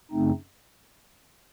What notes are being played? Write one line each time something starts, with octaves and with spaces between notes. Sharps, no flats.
F#2 C#3 A3 C4 D#4